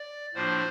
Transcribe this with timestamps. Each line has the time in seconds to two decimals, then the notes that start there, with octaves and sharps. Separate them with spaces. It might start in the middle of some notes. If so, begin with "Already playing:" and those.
Already playing: D5
0.34 A2 F3 A#3 D4 F4 C5